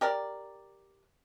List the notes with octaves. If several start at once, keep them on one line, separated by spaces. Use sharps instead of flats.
G4 A#4 D5